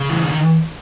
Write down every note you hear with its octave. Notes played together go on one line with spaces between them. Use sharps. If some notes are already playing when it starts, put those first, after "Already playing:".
Already playing: C#3
E3
D#3